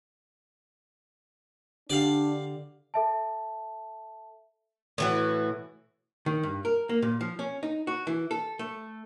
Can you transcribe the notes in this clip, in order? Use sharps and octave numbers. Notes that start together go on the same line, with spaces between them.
D3 D4 G4 D5 F5
A4 E5 A5
A2 E3 F#4
D#3
G2
A#4
A#3
A#2
F3
C#4
D#4
F#4
E3
A4
A3